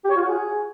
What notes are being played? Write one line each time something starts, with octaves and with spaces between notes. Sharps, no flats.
G4
C#5
F4
F#4
G#4